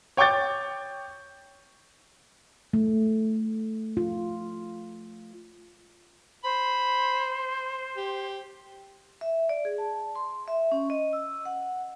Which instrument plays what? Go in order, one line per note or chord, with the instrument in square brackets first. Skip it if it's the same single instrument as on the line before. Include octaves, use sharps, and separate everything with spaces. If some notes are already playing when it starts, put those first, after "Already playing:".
[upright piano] C#5 G5 C#6 D6 G6 A6
[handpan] A3
F4
[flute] C5 [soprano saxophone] B5
[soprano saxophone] G4
[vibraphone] E5
D5
G#4
A5
C6
E5
C#4
D#5
E6
F#5